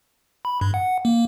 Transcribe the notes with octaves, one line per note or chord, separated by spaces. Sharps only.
B5
G2
F#5
A#3